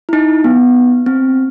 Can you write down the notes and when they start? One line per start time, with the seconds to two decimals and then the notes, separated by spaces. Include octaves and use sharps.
0.09 E4
0.13 D#4
0.44 B3
1.06 C4